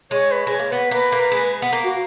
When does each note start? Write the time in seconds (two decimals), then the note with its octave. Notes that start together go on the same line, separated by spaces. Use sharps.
0.11 G#3 C#5
0.31 B4
0.47 G#3 C#5
0.59 A#3
0.71 B3 B4
0.91 A#3 B4
1.12 A#3
1.32 G#3
1.62 B3
1.73 A#3
1.84 F#4